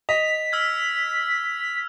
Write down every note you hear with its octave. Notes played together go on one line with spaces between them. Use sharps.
D#5 B6 F7
E6 F6 G#6